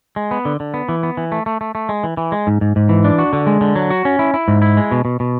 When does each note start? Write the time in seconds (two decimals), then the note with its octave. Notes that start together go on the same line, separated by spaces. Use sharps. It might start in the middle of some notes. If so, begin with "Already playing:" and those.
0.16 G#3
0.31 B3
0.45 D3
0.60 D3
0.74 B3
0.89 E3
1.03 B3
1.17 E3
1.32 A3
1.46 A3
1.61 A3
1.75 A3
1.89 G#3
2.04 E3
2.17 E3
2.32 G#3
2.47 G#2
2.61 G#2
2.76 G#2
2.89 E3
3.04 D4
3.19 F#4
3.33 D3
3.47 G#3
3.61 D3
3.76 F#3
3.90 F#4
4.05 C#4
4.19 E4
4.34 E4
4.48 G#2
4.62 E4
4.77 G#3
4.91 B2
5.05 B2
5.20 B2